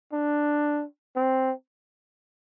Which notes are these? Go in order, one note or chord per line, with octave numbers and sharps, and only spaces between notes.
D4
C4